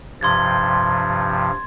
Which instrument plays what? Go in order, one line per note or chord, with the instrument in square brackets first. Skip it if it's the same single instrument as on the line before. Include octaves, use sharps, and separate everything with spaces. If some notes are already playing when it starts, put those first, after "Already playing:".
[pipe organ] G2 C3 F3 [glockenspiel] C6 G#6 A6